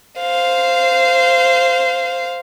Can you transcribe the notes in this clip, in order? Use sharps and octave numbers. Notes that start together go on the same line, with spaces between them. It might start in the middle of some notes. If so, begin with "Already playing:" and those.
C5 F5